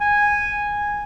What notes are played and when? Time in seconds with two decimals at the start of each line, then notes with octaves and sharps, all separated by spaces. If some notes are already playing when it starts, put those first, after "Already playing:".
0.01 G#5